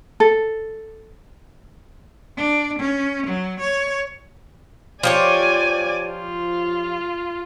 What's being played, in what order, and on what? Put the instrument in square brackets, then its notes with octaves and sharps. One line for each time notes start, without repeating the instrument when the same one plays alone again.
[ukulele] A4
[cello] D4
C#4
F#3
C#5
[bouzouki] F3 G4 C#5 [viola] D5 G#5
[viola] F4